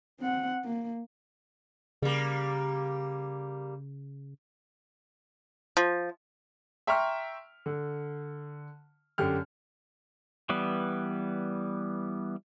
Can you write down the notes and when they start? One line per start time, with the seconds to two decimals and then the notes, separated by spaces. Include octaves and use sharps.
0.20 C4 F#5
0.65 A#3
2.02 C#3 G3 A#3
5.77 F3
6.87 E5 G5 A#5 C6 C#6 F6
7.66 D3
9.18 F#2 D3 G4 F6
10.49 E3 G3 B3